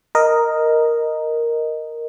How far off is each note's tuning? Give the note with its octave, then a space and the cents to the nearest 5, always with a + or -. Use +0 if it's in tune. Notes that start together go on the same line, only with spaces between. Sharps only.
A#4 +0 D#5 +0